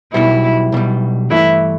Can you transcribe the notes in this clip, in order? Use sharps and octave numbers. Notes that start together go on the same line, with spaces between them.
B1 B2 G3 E4
B1 B2 G3
G2 E3 A3 E4